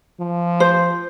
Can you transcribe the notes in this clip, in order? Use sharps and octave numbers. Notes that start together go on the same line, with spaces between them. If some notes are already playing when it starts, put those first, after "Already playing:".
F3
C5